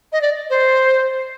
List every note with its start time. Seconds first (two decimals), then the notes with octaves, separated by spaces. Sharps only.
0.12 D#5
0.21 D5
0.50 C5